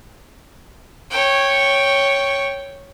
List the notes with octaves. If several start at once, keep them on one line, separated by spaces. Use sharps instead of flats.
C#5 G5